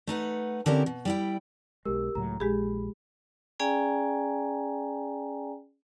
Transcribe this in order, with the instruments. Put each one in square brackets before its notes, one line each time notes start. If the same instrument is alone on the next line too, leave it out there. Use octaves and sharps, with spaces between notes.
[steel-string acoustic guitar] A3 D#4 B4 F#5
D3 C4 C#4 E4 G4 A#4
B2
G3 E4 G5
[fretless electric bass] B1 G#3 [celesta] G4 A#4 E6
[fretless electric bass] C#2 A2 F#3 [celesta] A#5
[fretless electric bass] A#1 [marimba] G#3 G4 G#4 [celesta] B5
[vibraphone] C#4 G#4 D5 G5 G#5 A#5